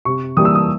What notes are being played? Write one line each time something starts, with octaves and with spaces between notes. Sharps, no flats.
C3 C#6
E3 G3 A#3 D#6
E6
D#6